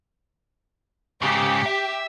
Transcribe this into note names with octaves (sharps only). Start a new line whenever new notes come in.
G#2 C#3 G4
E5